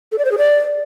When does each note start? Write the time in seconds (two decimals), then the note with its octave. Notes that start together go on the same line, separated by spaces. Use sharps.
0.12 A4
0.18 D5
0.25 C5
0.31 G#4
0.38 D5